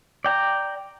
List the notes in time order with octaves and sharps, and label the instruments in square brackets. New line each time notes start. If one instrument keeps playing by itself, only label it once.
[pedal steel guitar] D5 G5 A#5